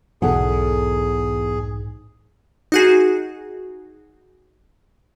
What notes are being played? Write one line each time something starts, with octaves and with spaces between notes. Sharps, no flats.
B1 E2 G#2 G#4 A4 F#5
D#4 F#4 G#4